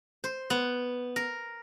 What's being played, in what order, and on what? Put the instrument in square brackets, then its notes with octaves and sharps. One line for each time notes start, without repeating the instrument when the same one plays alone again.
[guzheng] C5
B3
A#4